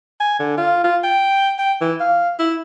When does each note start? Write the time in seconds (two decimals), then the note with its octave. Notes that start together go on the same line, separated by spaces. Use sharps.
0.20 G#5
0.39 D3
0.57 F4
0.84 F4
1.03 G5
1.58 G5
1.81 E3
2.00 F5
2.39 E4